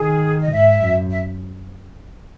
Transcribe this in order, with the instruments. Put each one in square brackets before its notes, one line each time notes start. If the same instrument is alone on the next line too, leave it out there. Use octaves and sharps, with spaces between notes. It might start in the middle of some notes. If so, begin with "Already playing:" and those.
Already playing: [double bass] D#3 [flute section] G#4
[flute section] D#5
[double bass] G#2 [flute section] E5
[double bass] F#2
[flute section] E5